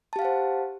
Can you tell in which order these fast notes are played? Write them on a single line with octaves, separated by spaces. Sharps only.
A5 G4 F5 F#5 C5